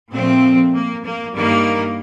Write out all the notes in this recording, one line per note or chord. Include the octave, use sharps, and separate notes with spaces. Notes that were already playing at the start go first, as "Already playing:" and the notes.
A#2 F3 A3 C4
A#3
A#3
G2 D#3 G3 A#3